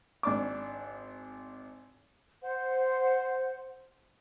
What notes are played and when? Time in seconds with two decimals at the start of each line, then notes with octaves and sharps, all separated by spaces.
0.23 G#1 D4 D6
2.42 C5 F#5